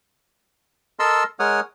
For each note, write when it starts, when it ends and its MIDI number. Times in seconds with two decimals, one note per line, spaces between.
0.99 1.24 69
0.99 1.24 70
0.99 1.24 75
0.99 1.24 81
0.99 1.24 84
0.99 1.24 88
1.39 1.60 56
1.39 1.60 70
1.39 1.60 73
1.39 1.60 78
1.39 1.60 87
1.39 1.60 89